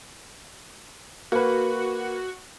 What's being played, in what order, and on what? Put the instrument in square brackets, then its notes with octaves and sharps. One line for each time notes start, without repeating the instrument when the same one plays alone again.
[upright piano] A#3 B4 [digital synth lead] F#4